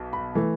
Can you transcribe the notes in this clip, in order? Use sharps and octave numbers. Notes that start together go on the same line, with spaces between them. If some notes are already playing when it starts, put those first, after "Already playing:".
Already playing: B1 B2
B5
E3 A3